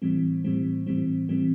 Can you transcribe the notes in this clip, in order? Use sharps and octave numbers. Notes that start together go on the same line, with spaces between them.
A2 E3 G3 C4
A2 E3 G3 C4
A2 E3 G3 C4
A2 E3 G3 C4